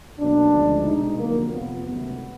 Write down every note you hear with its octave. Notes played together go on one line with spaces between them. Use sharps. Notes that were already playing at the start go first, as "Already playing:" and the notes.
C#2 B2 F#3 A#3 D4
D2 C#3 F3 G#3
C2 B2 G#3 D#4
F2 D3 F#3 A#3
F2 C3 F3 B3
C#2 C3 D#3 F#3 A3 B3